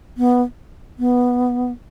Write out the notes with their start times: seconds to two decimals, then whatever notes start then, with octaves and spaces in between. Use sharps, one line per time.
0.18 B3
0.99 B3